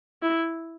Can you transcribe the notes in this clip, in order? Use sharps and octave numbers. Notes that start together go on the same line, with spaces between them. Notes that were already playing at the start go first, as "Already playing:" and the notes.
E4